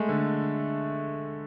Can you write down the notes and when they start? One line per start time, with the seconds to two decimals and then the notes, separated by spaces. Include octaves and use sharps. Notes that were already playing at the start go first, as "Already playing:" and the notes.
Already playing: G#3 A3
0.09 D3